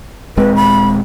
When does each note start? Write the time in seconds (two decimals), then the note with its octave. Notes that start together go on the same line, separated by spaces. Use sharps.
0.37 D#1 G#3 C4 B4
0.55 B5